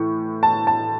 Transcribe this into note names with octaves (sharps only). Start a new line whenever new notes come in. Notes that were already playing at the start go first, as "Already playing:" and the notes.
Already playing: A2 E3 C#6
A5
A5